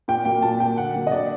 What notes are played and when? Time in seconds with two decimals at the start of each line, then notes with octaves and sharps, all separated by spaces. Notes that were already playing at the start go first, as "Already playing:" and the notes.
0.08 A#2 G5
0.25 F#3 A#3 G5
0.42 A#2 A5
0.60 F#3 A#3 G5
0.78 D3 F#5
0.95 F#3 A#3
1.07 D#5
1.11 D3 D5